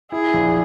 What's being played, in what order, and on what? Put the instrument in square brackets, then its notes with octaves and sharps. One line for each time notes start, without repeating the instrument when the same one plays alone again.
[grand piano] E4 [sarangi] G#4
[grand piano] A#1